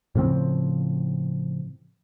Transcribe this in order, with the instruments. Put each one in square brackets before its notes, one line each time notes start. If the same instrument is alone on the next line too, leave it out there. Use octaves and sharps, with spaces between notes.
[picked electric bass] A2 C#3 F3 C4